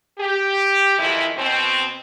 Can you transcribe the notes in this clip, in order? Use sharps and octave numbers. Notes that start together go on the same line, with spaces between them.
G4
F2 D#3 E3 G#3 E4
B2 C4